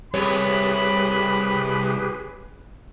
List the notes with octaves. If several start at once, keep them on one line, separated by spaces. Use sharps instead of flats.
C2 G4 G#4 B4 C#5 B5